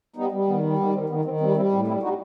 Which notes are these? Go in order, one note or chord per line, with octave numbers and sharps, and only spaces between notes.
G3 B3 D#4
G3
D#3 B3
G3
D#3 B3
D#3 C4
D#3 B3
D#3 C4
G3 C4
G3 C4 E4
A2 C4
G3 C4 E4
G3 D#4 F#4